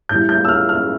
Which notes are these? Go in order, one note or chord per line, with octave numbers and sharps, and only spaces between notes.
A2 E3 G3 G6
G6
E6
F6
F6